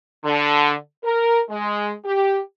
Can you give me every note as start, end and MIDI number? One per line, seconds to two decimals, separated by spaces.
0.25 0.73 50
1.04 1.40 70
1.50 1.92 56
2.06 2.40 67